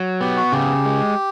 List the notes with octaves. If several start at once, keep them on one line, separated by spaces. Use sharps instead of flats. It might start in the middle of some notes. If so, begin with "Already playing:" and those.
Already playing: F#3
B3 G4
F#4
C#3 G4
G#3